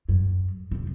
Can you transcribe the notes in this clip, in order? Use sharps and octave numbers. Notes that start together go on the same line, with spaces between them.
F#2
F2 C3